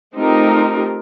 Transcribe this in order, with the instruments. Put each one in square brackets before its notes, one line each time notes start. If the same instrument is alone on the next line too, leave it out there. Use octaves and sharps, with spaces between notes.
[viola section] A3 C4 D#4 F4 G4 A#4